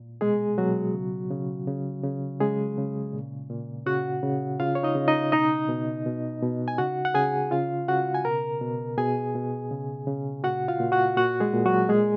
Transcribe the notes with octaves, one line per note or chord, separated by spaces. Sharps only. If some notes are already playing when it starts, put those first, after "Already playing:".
Already playing: A#2
B2 G#3 G#4
B2 F#3 F#4
C#3
C#3
C#3
C#3
C#3 G#3 G#4
C#3
A#2
A#2
C#3 F#4 F#5
C#3
C#3 F4 F5
C#5
D#4 D#5
C#3
D#4 D#5
B2 D#4 D#5
B2
B2
B2
G#5
C#3 F#4 F#5
F#5
C#3 G#4 G#5
C#3 F4 F5
C#3 F#4 F#5
G#5
B2 A#4 A#5
B2
B2 G#4 G#5
B2
C#3
C#3
A#2 F#4 F#5
F4 F5
A#2
F#4 F#5
A#2 F#4 F#5
G#3 G#4
A#2
F#3 F#4
A#2 G#3 G#4